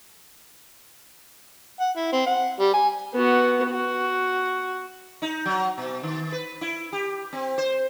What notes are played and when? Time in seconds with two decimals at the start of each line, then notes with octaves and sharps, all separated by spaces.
1.80 F#5
1.96 E4
2.12 C4
2.26 F#5
2.60 G3
2.74 G#5
3.14 B3 F#4
3.70 F#4
5.22 D#4
5.45 F#3
5.78 B2
6.03 D#3
6.32 B4
6.61 E4
6.93 G4
7.33 C4
7.58 C5